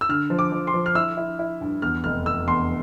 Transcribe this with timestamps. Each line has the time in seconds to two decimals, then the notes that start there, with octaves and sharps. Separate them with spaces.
0.01 E6
0.09 D3 F6
0.30 F3
0.39 D6
0.52 F3
0.67 C6
0.74 F3
0.86 F6
0.95 E4 E6
1.17 E4
1.39 E4
1.61 G2
1.82 E2 F6
2.04 F1 F6
2.26 F1 E6
2.47 E2 C6